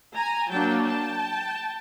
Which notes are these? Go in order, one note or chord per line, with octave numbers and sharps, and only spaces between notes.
G#5 A#5
F#3 A#3 D4 G5 A5
G5 A5